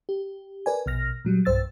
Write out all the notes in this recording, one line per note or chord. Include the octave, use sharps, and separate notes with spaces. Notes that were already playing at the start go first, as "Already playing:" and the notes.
G4
A#4 B4 D5 G#5
A#1 B2 F6 A#6
A#2 F#3 G3
B1 G2 C5 E6 A6